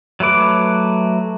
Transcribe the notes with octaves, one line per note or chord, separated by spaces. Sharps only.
F#3 A3 B4 D6